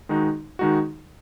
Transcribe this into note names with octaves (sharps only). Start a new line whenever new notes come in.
D#3 G#3 D#4 F#4
D#3 G#3 D#4 F#4